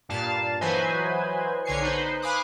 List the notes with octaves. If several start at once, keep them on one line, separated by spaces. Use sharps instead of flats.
G2 A#2 F5 A5
E3 F#3 B4 C5 D#5 G#5
B1 D3 C#5 G#5 C7 C#7
D#4 B4 C5
F5 G#5 B5 D6 D#6 F#6